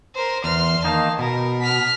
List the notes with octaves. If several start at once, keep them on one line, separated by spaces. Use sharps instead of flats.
A#4 C5
E2 C6 F6
D#3 A#3 D#4 A5
B2 A#4
F6 B6